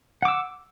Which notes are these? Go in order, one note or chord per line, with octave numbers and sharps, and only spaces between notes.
F#5 D6 E6